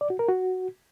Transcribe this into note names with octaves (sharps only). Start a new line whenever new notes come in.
D5
F#4
A#4
F#4